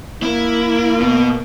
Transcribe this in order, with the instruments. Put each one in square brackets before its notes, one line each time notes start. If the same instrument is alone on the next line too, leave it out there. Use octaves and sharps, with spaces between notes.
[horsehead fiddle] A#3 [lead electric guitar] E4
[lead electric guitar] B2